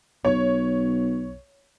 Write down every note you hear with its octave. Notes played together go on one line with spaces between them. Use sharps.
B1 C#5